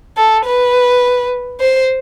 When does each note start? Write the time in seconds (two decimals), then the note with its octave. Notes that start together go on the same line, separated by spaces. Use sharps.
0.17 A4
0.45 B4
1.60 C5